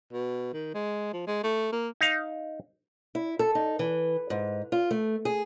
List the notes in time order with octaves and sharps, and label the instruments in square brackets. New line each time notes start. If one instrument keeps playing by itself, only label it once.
[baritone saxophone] B2
D#3
G#3
F3
G#3
A3
A#3
[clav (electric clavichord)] D#4 F5
[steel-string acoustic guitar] E4
A4
D#4
E3
G#2
F4
A3
G#4